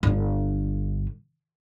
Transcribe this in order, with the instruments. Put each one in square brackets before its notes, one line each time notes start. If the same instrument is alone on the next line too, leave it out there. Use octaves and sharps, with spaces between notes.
[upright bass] G1 D3